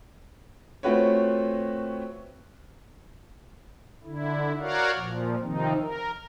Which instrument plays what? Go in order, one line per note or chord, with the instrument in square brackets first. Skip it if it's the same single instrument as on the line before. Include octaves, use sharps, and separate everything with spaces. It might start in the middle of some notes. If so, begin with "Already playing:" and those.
[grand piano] A3 C4 F4 F#4 B4 C#5
[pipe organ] D3 E4
F#4 A#4 C#5 D5 F5 F#5
A#2 F3
C3 D#3 F3 C4 D#4
A#4